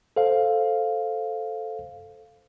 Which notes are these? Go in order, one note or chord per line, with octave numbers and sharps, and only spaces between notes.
A4 C5 F5